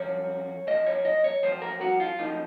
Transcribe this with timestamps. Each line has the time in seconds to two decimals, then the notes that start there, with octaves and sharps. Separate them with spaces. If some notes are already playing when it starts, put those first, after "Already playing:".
Already playing: F#2 F3 C#5
0.67 F#2 F3 D#5
0.86 C#5
1.05 D#5
1.24 C#5
1.43 F#2 F3 C5
1.62 A#4
1.81 F#4
2.00 F4
2.19 F#2 F3 D#4